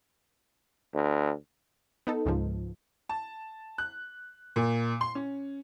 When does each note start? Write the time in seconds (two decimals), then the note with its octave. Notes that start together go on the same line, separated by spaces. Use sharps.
0.94 D2
2.07 B3 D#4 A4
2.26 C#2 G#2 F3
3.09 A5
3.78 F#6
4.56 A#2
5.01 C6
5.15 C#4